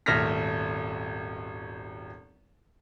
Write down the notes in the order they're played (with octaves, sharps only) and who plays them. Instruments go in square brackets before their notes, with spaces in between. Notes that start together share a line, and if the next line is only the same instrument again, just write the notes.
[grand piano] D#1 G#1 A3 F6 A#6 B6